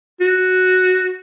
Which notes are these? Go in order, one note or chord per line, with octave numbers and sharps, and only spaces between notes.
F#4